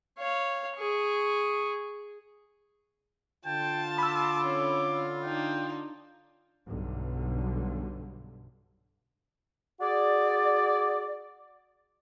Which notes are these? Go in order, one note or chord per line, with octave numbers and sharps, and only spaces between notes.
C#5 F5
G#4 C#6
D3 F4 G5 A5
B5 D6 E6
C#4
D4 D#4 G5
B1 G2 D3
F#4 G#4 D5